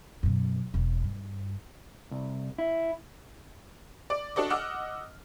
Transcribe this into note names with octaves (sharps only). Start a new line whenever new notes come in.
F#2 B2
E1
G2
C2
E4
D5 D6 D7
D4 F#4 A4 D5 D#5
D#5 F#5 D6 E6 F6